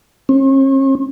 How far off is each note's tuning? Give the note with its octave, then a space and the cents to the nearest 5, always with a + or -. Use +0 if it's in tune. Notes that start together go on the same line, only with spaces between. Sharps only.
C#4 -45